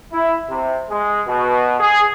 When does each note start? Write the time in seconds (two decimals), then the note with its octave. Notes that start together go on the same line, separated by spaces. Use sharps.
0.12 E4
0.49 C3
0.90 G#3
1.27 B2
1.79 G#4